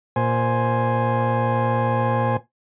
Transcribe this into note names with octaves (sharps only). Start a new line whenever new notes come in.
A#2 C5 G#5